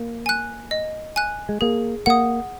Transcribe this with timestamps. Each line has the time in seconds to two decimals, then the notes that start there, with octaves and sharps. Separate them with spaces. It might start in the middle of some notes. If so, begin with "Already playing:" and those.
Already playing: A#3
0.26 G#5 F#6
0.71 D#5
1.16 G#5 F#6
1.49 G#3
1.61 A#3 G#4
2.06 A#3 F#5 D#6